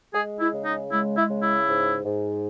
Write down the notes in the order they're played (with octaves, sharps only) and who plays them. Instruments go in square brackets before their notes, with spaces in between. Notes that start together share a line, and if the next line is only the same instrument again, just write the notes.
[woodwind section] G#3 G#4
E4
C#3
D#4
G#3 E4
E4
C#3
E4
G#2
G#2